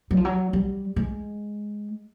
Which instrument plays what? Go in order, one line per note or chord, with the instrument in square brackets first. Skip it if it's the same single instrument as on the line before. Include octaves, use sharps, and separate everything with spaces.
[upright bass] F#3
F3
F#3
G3
G#3